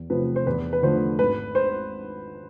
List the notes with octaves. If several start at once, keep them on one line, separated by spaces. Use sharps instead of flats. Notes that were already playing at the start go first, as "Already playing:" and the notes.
Already playing: E2
C3 F3 A3 B4
C5
E2 B4
B4
D3 F3 A3 C5
G#1 B4
C5